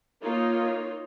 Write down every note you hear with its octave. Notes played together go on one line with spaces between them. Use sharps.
A#3 D#4 F4 C#5